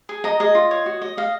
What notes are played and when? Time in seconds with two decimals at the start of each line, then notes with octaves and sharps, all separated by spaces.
0.09 G#4
0.24 D#5 A#5
0.40 G#4 D#5
0.55 F4
0.71 C#5
0.86 F#4
1.02 D#5
1.17 D#5 F5